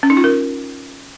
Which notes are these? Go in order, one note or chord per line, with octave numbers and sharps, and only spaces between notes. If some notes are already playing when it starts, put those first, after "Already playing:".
C#4
D#4
F4
A#4